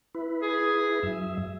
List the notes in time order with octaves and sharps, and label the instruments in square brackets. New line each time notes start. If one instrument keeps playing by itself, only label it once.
[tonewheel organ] E4 B4
[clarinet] G#4
[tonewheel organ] F#2 E5